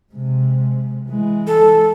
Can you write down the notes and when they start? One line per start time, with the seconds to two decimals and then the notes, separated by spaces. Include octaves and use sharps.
0.13 C3 G#3
1.09 E3 G#3
1.47 A4